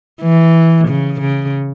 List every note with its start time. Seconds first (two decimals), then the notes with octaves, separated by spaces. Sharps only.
0.22 E3
0.87 C#3
1.20 C#3